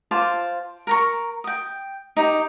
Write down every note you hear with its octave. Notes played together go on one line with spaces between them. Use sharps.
F4 C5 A5 D6
A#4 A#5 C#6
G5 D#6
D#4 G4